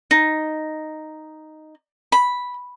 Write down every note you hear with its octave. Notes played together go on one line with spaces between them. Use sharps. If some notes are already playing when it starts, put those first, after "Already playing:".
D#4
B5